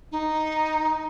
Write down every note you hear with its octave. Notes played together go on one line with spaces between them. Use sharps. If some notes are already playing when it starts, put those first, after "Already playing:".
D#4